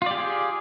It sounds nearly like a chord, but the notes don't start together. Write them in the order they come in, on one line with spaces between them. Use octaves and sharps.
F4 D5 G4 G#4